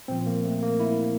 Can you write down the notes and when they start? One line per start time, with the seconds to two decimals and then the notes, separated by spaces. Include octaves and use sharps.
0.08 A#2 F3 C4
0.26 A#3
0.45 A3
0.63 A#3
0.80 E4